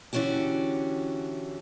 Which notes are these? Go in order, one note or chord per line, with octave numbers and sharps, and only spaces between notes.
D3 E3 C#4 F#4 G4